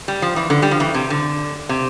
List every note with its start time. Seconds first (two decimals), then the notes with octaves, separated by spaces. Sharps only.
0.08 G3
0.22 F3
0.36 E3
0.50 D3
0.62 G3
0.71 F3
0.80 E3
0.94 C3
1.10 D3
1.69 C3